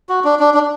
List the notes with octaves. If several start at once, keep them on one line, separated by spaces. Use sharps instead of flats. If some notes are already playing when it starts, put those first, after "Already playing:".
F#4
D4
D4
D4